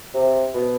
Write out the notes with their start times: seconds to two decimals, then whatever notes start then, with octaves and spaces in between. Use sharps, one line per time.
0.14 C3
0.54 B2